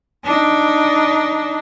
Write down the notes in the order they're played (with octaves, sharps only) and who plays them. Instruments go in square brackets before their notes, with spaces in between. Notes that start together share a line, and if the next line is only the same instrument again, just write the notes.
[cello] D4 D#4